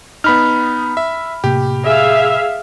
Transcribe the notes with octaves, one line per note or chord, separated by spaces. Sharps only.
B3 D#4 B5 F6
E5
A2 C3 A#3 G4
G#4 E5 F5